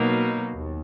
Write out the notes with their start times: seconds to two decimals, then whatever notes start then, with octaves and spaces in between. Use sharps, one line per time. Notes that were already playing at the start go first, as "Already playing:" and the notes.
Already playing: B2 F#3 A#3 D#4
0.53 D#2